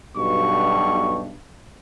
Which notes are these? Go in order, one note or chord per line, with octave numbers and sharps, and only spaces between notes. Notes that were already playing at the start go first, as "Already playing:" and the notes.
B1 G2 B2 C#6